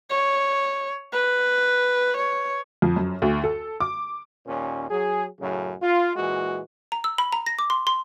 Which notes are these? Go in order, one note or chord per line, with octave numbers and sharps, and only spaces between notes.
C#5
B4
C#5
F2
F#2
D2
A4
D6
D#2 A#2 C#4
F#3 G#4
F#2 A2 C#3 F#3
F4
A#2 E3 G#3 F#4
A#5
E6
B5
A#5
A#6
D6
C6
C6